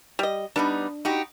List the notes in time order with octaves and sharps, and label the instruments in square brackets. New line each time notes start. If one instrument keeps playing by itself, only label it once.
[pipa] G3 D#5
[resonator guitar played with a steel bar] G3 B3 D#4 [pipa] D4
[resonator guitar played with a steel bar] D#4 F#4 G4